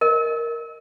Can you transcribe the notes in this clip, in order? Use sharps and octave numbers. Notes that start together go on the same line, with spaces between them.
A#4 D#5